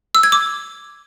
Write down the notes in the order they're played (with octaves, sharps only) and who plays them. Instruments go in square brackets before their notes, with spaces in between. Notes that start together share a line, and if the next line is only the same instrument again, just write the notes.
[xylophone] E6
G#6
D6